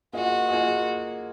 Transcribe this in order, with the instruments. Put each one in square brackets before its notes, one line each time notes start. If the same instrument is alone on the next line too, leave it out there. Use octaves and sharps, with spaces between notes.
[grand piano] A#3 F4 G#4 D#5 [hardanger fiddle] F#4
[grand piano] A#3 F4 G#4 D#5